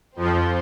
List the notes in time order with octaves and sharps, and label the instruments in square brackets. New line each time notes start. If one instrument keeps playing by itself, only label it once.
[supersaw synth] F2 F3 [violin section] C4 A4 C5